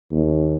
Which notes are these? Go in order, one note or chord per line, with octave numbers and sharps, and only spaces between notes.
D#2